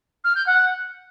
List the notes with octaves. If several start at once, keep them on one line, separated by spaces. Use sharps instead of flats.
F6
G6
F#5